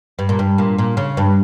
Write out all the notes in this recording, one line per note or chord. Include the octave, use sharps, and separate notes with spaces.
G2
A#2
G2
A#2
A#2
C#3
G2